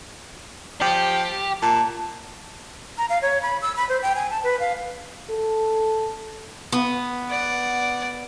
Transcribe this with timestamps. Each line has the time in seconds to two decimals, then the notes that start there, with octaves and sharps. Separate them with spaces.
0.81 F3 G4
1.62 A#2 A5
2.98 A#5
3.10 F5
3.22 C#5
3.42 B5
3.62 E6
3.76 B5
3.89 C5
4.03 G5
4.15 G#5
4.30 A5
4.44 B4
4.60 F5
5.30 A4
6.72 B3
7.30 D5 F#5